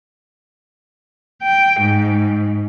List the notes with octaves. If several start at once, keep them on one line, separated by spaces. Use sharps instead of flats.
G5
G#2